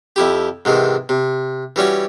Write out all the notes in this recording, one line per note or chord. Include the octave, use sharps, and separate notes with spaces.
F2 E4 G4
G#2 C3 D#3 E3
C3
E3 G3 C#4 F#4